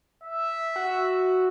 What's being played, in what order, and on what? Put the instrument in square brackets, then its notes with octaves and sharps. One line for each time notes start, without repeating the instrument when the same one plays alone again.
[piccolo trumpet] E5
[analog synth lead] F#4